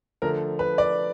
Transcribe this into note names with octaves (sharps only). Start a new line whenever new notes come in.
D3 F3 A3 A#4
B4
D5